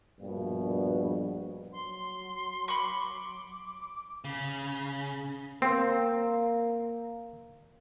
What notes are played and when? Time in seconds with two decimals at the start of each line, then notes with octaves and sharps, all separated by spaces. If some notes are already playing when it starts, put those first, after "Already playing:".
0.19 A#1 G2 B2
1.73 F#3 C6
2.68 B5 C#6 D6
4.25 C#3
5.62 A#3 C4